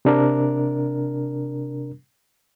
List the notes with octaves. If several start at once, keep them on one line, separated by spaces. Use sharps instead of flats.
C3 D4 A#4